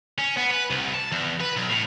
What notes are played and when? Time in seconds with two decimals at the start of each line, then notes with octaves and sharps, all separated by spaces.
0.18 C#4
0.37 B3
0.51 B4
0.70 C2
0.94 A5
1.12 E2
1.40 B4
1.56 B1
1.69 A2